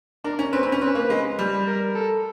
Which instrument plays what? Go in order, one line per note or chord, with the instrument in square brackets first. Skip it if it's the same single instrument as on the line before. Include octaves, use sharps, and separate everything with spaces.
[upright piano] D4 [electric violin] A#4
[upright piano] C#4
[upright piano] C4 [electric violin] B4
[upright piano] C4
C#4
[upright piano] C4 [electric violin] B4
[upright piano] A#3
G#3
G3
[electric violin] A#4
A4